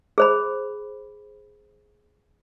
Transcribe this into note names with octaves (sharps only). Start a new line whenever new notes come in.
G#4 C5 B5